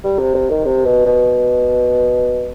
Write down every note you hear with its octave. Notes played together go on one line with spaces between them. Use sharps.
G3
C3
C3
D#3
C3
B2
B2